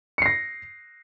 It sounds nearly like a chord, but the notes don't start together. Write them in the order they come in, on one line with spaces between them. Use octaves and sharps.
C#7 C7 A#6